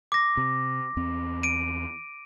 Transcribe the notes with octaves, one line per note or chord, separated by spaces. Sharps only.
D6 A#6
C3
E2 C4
D7 D#7